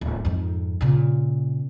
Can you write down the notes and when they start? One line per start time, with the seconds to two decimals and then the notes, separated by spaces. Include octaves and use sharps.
0.01 D1
0.25 F2 G#2
0.81 A#2 C#3